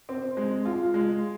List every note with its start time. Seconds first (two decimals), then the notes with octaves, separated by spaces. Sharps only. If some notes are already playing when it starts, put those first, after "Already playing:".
0.09 C4
0.37 G#3
0.65 F4
0.94 G#3